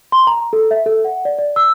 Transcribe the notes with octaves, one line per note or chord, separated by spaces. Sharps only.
C6
A#5
A4
E5
A4
F#5
D5
D5
E6